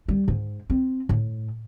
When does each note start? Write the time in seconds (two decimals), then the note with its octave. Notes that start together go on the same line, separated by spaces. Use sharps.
0.09 G3
0.28 G#2
0.70 C4
1.09 A2